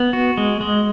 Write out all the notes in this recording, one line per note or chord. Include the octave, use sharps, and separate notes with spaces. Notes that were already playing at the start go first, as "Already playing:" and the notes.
Already playing: B3
F#4
G#3
G#3